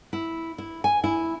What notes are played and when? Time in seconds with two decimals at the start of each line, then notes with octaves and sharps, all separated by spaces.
0.13 E4
0.58 E4
0.84 G#5
1.04 E4